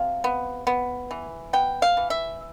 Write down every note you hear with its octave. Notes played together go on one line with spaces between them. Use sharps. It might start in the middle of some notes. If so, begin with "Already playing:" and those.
Already playing: C3 F5
B3
B3
E3
B3 G5
F5
E3
E5